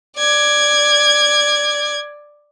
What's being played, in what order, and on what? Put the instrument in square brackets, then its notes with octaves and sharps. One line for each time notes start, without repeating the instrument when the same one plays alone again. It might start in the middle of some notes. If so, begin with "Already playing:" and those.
[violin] D5 G#6